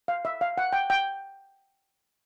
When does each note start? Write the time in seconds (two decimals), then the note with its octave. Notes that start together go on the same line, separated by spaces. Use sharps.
0.08 F5
0.25 E5
0.41 F5
0.58 F#5
0.73 G5
0.90 G5